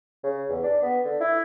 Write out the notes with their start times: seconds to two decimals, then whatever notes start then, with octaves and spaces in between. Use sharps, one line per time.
0.23 C#3
0.49 E2
0.63 D4
0.82 B3
1.05 D3
1.20 E4